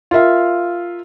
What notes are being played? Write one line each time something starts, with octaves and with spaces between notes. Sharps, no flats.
F4 A#4 E5 F5